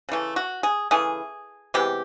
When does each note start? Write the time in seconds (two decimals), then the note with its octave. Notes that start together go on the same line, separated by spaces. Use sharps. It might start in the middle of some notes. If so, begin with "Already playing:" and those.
0.09 C#3 E3 A3
0.36 F#4
0.63 G#4
0.91 C#3 E3 A3 G#4
1.74 C3 E3 G#3 B3 G4